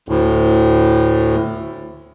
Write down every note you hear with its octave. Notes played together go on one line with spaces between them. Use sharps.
D2 A2